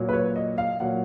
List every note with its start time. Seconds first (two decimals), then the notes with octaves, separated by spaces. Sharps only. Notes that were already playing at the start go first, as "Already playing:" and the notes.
Already playing: A#2 F#3
0.09 B4
0.13 C#5
0.36 D#5
0.58 F5
0.80 A#2 F#3 F#5